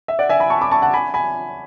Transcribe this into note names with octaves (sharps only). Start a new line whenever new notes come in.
E5
D5 F#5
E5 G#5
G#5 B5
A5 C#6
B5 D6
A5 C#6
F#5 A5
G#5 B5
G#5 B5